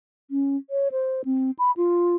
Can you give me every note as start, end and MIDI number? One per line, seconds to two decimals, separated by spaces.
0.31 0.56 61
0.70 0.88 73
0.91 1.21 72
1.25 1.51 60
1.59 1.71 83
1.77 2.16 65